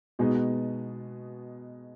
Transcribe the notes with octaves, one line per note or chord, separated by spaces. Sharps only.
B2 G#3 B3 D#4 F#4